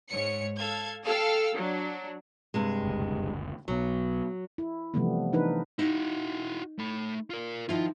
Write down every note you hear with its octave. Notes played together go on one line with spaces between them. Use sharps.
G#2 C#5 C#7
A4 F5 G#6
A4 F5 G5 A5 E6 F6
F#3 D4
G2 C3 G#3
F#1 D2
B1 F#3 B3
E4
C3 E3 F3 G3 A3 B3
E3 D4 D#4 A#4 B4
D#4 E4 F#4
A3 B5
F4 A#4
D#3 F3 E4 F4